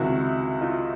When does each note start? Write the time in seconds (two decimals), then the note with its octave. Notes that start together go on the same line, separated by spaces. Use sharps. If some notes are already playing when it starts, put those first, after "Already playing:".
Already playing: C#2 C3 D#3 E4 F#4
0.61 D#4 F4